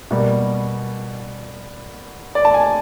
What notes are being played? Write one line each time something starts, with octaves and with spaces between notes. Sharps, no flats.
B2 G3 A#3
D5
A5
G#5